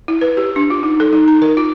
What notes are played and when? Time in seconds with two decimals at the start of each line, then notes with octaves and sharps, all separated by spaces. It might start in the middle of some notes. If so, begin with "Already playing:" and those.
0.08 E4
0.21 B4
0.37 G4
0.56 D4
0.70 F4
0.83 D#4
1.00 A4
1.13 D#4
1.28 A#5
1.42 A#4
1.57 F4